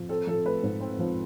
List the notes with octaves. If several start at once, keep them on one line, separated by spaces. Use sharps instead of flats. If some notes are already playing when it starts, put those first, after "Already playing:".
Already playing: F3
C4 A4
F3 A4
A3 B4
G#2
C4
F3